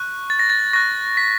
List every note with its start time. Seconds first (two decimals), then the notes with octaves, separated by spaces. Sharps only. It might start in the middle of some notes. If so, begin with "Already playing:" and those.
Already playing: C#6 F#6
0.30 A6
0.39 A#6
0.50 A6
0.73 C#6 F#6 A#6
1.17 B6